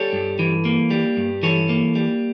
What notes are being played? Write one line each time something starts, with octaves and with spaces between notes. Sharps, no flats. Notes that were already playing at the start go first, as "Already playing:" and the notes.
Already playing: G3 A4 C#5
G2
E3
A#3
G3
G2
E3 A4 C#5
A#3
G3